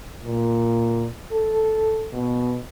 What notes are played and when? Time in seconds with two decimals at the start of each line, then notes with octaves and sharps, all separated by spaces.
0.24 A#2
1.32 A4
2.12 B2